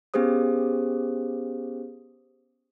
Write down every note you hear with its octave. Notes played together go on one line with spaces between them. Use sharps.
B3 C#4 G4 G#4 C5 D#6